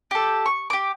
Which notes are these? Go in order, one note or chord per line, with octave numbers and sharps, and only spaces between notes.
G4 A4
C#6
G4 D6